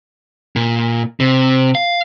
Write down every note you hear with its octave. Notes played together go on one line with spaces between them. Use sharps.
A#2
C3
F5